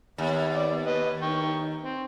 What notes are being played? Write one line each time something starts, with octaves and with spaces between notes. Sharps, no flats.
D#2 B3
D5
B4 D#5
D#4 G5 C#6
C4